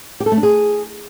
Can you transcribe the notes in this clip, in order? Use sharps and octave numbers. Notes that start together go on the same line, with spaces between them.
G4
A4
A3
D4
G#4